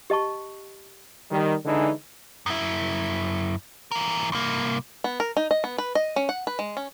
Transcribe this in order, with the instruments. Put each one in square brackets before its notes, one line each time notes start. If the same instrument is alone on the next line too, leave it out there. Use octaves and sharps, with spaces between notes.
[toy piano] G4 D#5 A5 C#6
[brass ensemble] D#3 G3
D3 E3 G#3 D4 D#4
[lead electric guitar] F#2 E4
E3 A#4
C2 A#3
[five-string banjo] B3
A#4
D#4
D#5
B3
B4
D#5
C#4
F#5
B4
G#3
C#4